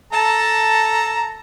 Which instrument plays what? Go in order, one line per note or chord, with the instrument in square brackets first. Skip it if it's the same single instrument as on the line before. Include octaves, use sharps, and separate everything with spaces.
[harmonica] A4 A#5 [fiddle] A5